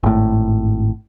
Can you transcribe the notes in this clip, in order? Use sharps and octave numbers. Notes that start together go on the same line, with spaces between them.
G#1 A2